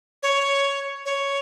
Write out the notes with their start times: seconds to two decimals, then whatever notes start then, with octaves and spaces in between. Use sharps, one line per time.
0.23 C#5
1.05 C#5